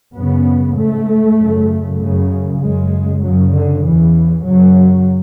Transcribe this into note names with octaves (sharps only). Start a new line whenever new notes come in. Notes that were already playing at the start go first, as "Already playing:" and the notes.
F#2 C#3 B3
G#2 A3
F#2 C#3
F#2 C#3
F#2 C#3 G#3
F#2 C#3 F#3
D3
E2 C#3 E3
F#2 C#3 F#3